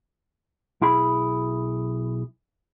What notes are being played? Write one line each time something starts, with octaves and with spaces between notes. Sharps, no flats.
B1 E4 G#4 B5